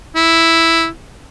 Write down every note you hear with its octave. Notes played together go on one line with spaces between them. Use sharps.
E4